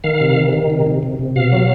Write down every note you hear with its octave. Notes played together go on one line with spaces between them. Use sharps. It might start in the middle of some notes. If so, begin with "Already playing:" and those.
D#3 F5
C3
D#3
D#3
C3
C3
C3
C3
B2 F5
F#3